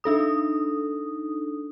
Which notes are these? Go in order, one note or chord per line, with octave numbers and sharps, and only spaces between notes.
D4 D#4 A4 D#6